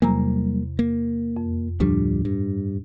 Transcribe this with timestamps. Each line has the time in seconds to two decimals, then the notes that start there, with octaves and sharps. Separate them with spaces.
0.02 E2 C3 F#3 G3 A#3 A#5
0.79 A#3
1.37 F2
1.80 D2 A2 F3 G3 D4
2.25 G2